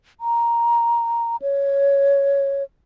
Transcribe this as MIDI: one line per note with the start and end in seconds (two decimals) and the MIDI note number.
0.20 1.36 82
1.42 2.63 73